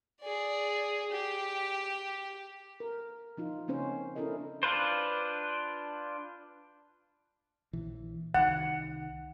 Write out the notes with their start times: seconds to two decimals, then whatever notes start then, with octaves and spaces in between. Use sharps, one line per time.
0.22 G#4 D5
1.11 G4
2.80 A#4
3.37 F3 D#4 F4
3.68 C#3 A#3 C4 C#4 C5
4.16 C#4 D4 E4 A4 A#4 D#5
4.63 D4 F4 B4 C5
7.73 A#1 E3
8.34 C2 D#3 F#5